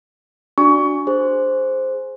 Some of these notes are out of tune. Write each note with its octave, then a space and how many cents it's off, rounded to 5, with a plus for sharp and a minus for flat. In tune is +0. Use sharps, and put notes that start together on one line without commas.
D4 +0 F#4 +0 C#6 +25
G#4 +0 C5 +0